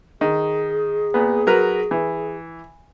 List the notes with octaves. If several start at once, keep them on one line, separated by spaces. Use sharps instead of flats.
D#3 G#4
A#2 B3
F#3 A#4 B4
E3